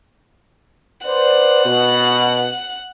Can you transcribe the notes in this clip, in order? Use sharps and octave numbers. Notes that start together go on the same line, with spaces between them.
B4 C5 D5 F#5
B2